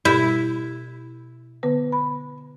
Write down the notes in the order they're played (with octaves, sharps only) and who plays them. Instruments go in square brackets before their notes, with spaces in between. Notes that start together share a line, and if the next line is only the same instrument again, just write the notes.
[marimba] B2 G4 G6 [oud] E4
[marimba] D3 B3 B4
B5